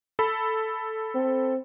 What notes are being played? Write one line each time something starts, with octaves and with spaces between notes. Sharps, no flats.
A4 B5
C4